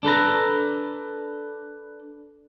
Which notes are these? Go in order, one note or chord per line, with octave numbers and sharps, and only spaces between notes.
D4 A4 B4 A#5